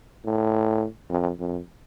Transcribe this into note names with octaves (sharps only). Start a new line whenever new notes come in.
A2
F2
F2